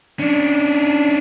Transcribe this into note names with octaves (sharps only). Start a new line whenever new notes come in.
C#4 D4